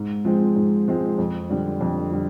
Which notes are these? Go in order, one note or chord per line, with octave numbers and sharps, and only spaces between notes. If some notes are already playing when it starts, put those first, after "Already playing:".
Already playing: G#2
F3 G#3 C4
G#2
F3 G#3 C4
F2
D3 G3 D4
F2
D3 G3